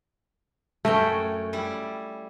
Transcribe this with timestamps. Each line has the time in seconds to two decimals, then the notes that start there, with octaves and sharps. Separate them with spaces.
0.85 F#2 A3 C#4 G5
1.53 G3 E4